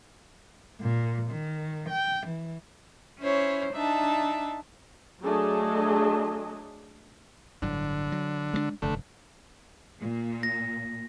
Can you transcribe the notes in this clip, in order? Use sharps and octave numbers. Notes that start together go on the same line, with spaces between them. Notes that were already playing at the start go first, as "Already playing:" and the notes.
A#2
D#3
G5
E3
C#4 E4 C5 C#5
D4 D#4 E5 A5
F#3 A3 D4 G#4 A4 D#5
G1 A2 D3 F#3
F#3
G#3 A3 D4
F1 G2 D3 A3
A#2
A#6